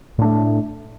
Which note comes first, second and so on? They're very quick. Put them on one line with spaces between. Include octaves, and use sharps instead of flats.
A2 D4 A3